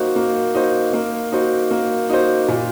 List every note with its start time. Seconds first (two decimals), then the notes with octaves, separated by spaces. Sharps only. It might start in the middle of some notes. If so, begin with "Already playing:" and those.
Already playing: A#3 D#4 F#4 C5
0.16 A#3
0.54 D#4 F#4 C5
0.93 A#3
1.32 D#4 F#4 C5
1.71 A#3
2.09 D#4 F#4 C5
2.48 A#2